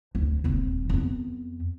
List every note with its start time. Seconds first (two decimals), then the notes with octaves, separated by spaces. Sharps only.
0.15 D2
0.44 D#1 C4
0.89 F2 B3